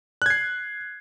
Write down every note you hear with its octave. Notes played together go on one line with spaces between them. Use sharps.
F#6 G#6 C7